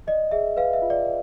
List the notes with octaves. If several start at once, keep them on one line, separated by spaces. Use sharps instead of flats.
D5 D#5
G#4 E5
B4 F5
E5
F4
D5